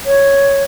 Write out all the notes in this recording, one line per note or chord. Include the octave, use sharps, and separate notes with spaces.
C#5